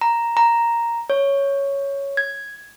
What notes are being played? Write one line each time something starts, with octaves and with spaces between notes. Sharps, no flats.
A#5
A#5
C#5
G#6